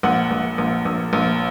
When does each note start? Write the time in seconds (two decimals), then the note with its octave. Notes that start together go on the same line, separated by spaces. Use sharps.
0.03 A#1 F#5
0.31 A#1
0.58 A#1
0.85 A#1
1.13 A#1